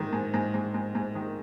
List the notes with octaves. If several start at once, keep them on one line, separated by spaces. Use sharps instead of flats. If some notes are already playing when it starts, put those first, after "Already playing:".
Already playing: G#2 D#3
G#2
G#2
G#2
G#2
G#2
D#3